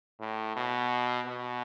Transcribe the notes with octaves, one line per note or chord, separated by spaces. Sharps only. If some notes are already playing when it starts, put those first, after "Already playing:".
A2
B2
B2